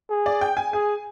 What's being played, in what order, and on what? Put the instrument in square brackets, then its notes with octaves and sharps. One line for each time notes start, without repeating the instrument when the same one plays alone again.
[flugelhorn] G#4
[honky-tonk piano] D5
G5
G#5
[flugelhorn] G#4 [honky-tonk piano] G#5